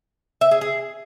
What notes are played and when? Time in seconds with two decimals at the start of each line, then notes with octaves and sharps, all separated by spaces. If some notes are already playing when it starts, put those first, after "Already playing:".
0.41 E5
0.51 G#4
0.61 G#4